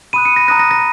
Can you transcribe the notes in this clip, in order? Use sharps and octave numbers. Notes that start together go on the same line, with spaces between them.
B5 D#6 F#6 D#7
C#7
A#6
A#5 D#6 F#6 A#6
A#6
A#6